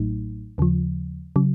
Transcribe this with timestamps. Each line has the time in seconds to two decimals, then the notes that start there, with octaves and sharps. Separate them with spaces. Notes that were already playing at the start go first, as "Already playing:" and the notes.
Already playing: A1 A2 F#3 A3 D#4
0.58 D#2 C#3 F3
1.36 C#3 F#3